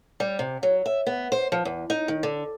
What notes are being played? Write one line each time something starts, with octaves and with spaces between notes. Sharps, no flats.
G3
C3
F#3
E5
B3
C5
F3
E2
D#4
D#3
D3